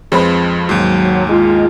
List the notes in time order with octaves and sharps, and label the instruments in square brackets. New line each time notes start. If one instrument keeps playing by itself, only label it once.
[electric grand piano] F2 F3 [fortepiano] G#3 C4 B4
[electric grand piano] D#2 G#2 [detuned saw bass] F#3
[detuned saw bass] G#3 [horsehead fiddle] F4